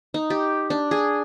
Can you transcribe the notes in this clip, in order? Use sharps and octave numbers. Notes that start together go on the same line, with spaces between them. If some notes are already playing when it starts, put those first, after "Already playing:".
D#4
G4
D4
G#4